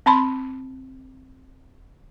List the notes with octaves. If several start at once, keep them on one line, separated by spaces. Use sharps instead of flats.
C4 A5 B5 C6